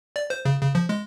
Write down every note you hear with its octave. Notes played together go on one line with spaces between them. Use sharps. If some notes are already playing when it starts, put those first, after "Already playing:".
D5
C5
C#3
C#3
F3
G#3